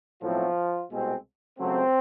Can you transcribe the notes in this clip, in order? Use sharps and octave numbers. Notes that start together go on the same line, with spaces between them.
B1 A2 F3 F#3 A3 C4 F4
C2 B2 G#3 C4
C#2 C#3 F#3 A3 C4